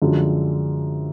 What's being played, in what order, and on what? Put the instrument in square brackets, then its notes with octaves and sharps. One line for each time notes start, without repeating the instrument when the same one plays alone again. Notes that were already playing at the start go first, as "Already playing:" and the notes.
[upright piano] F#2 D3 F3 G#3